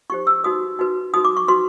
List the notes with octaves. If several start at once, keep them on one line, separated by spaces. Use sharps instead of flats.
D#4 G4 C5 C#6
E6
D#4 F#4 B4 D#6
D#4 F#4 B4
D#4 F#4 B4 D#6
D6
C#6
D#4 F#4 B4 C6